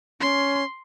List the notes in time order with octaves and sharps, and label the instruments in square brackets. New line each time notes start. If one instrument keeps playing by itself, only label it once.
[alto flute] C#4 [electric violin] C6